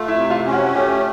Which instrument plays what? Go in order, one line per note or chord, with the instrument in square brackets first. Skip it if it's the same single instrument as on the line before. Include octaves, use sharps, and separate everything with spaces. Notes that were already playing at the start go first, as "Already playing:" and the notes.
Already playing: [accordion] A3 [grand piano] F4 F5
[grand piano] E4 E5
[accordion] C3
[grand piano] F4 F5
[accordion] C#4
[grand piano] F#4 F#5
[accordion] A3 [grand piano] G4 G5